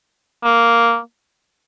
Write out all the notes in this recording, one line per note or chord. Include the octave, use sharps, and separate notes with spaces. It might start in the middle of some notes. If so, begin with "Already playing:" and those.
A#3